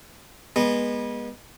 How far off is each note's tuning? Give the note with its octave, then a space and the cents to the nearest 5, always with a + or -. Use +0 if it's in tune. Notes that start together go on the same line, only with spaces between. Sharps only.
G#3 -20 B3 -30